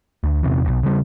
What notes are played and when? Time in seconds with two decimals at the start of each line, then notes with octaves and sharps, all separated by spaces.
0.24 D2
0.43 E2 C3 E3
0.65 E1 B1
0.83 C#3 G3